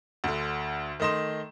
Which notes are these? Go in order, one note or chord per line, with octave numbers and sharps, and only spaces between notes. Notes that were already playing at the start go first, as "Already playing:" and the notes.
D2 D3
D#3 A3 D#5 C6 E7